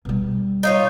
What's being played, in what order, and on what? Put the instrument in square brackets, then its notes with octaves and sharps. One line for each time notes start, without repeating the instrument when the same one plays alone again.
[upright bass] B2 G3
[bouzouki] D#4 F4 C#5